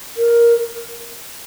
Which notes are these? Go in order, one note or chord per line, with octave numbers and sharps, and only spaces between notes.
A#4